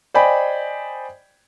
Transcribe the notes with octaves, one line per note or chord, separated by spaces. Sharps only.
C5 D5 D#5 G5 G#5 B5